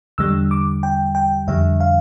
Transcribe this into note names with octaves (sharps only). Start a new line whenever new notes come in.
E2 D3 G3 E6
D6
G5
G5
F2 D3 G3 E5
F5